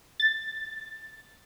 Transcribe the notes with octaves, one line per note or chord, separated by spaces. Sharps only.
A6